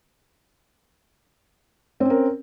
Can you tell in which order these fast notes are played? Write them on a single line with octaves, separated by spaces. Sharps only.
C4 C#4 A#4